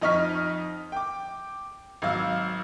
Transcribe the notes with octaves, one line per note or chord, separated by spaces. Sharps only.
F2 D#4 D#5 C#6 F6 B6
G5 D6
G#1 F#3 F5 E6